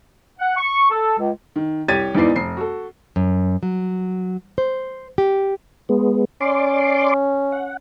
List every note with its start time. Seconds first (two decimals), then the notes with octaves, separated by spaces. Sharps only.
0.40 F#5
0.57 C#6
0.90 A4
1.18 C#2
1.56 D#3
1.88 C2 G4 C#5 G#6 A6 D#7
2.15 E2 G#2 E3 B3 D5 C7
2.35 F1 C7
2.57 F#4 A4
3.16 F#2
3.63 F#3
4.58 C5
5.18 G4
5.89 G#3 B3
6.41 C#4 D5 C6 D6
7.52 F#5